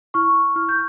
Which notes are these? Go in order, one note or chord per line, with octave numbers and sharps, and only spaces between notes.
E4 C#6 F6
E4 F6
G6